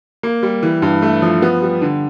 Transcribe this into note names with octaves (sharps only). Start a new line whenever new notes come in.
A#3
G3
E3
G2
A3
F3
B3
G3
D3